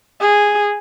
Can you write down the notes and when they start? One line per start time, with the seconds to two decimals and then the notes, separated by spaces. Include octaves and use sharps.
0.21 G#4